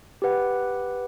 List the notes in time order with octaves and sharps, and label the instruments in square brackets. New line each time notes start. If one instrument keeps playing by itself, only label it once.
[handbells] G4 B4 F#5